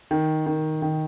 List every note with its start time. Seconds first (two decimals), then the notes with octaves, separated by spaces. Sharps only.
0.11 D#3
0.46 D#3
0.82 D#3